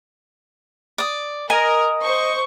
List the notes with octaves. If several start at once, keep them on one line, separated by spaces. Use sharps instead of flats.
D5 D#6
A#4 D#5 G#5
C5 C#6